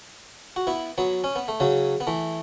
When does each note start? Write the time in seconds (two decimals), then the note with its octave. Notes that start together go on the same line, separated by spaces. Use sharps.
0.56 F#4
0.67 B3 E4
0.98 F#3 B3
1.24 C#4
1.36 B3
1.48 A3
1.60 C#3 F#3
2.01 B3
2.07 E3 A3